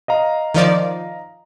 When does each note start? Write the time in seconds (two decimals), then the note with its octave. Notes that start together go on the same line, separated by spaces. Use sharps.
0.08 D#5 F5 A#5
0.54 D#3 F3 D5